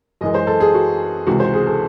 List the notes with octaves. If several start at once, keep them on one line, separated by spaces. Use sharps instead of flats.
F#2 E3 G#3 D#5
C5
A4
G#4
F#4
C#2 C3 E3 F#4
C5
G#4
A4